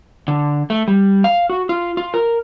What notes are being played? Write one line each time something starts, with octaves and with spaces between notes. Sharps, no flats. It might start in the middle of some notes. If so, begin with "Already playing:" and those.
D3
A3
G3
F5
F#4
F4
F4
A#4